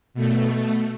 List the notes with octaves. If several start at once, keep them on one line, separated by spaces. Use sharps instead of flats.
B2 A3